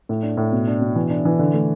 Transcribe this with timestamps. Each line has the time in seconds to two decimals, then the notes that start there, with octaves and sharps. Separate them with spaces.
0.09 A2
0.23 D4
0.37 A2
0.52 B2
0.67 D4
0.81 B2
0.96 E3
1.10 D4
1.25 E3
1.39 D3
1.53 A3